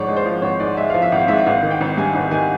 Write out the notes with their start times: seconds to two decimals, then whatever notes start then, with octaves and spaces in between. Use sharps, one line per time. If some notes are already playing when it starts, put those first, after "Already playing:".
Already playing: G#1 G#2 F3 C#5 D5
0.08 G#3
0.16 C5
0.25 F3
0.42 G#1 C#5
0.60 G#2 D5
0.76 G#3 E5
0.90 F3 F5
1.02 E5
1.12 G#1 F5
1.28 G#2 E5
1.46 G#1 F5
1.63 D#3
1.71 G5
1.81 G#1
1.97 G2 G#5
2.15 G#1
2.31 D#3 G#5